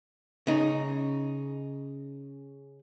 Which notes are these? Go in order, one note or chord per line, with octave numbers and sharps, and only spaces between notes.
C#3 D#4